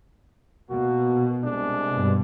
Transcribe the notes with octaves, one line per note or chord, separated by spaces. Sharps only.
B2 A#3 F#4
C2 G#3 D4
G2 B2